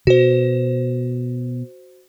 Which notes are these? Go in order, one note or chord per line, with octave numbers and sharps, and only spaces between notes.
B2 F#4 C5